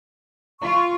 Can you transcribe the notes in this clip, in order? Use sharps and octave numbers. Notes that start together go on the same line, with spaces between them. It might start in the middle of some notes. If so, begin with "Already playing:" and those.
F4 C#6